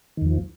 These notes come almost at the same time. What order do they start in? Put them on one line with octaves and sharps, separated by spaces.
D#3 E2 F3